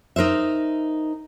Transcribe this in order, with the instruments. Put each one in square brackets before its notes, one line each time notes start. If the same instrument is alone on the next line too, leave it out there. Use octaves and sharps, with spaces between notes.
[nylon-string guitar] D#4 A#4 C5 E5